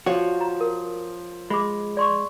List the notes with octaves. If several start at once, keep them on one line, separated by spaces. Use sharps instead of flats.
F3 F#4 C#5
A#5
A#4
G#3 B5 D6
D5 C6 C#6